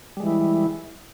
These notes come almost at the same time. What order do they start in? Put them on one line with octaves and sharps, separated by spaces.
G3 G#3 E3 E4